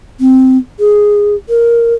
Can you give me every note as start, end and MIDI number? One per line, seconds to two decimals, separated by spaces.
0.20 0.57 60
0.80 1.35 68
1.49 1.94 70